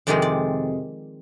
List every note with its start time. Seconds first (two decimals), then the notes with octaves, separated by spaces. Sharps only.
0.07 F2 C3 D#3 G#3 C4 D5
0.22 D5